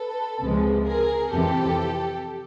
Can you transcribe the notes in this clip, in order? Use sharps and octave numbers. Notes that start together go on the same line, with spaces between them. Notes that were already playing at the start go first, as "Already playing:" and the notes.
Already playing: A4 B4
C#2 C3 F3 G#3
G#4 A#4
F2 C3 E3 G4 A4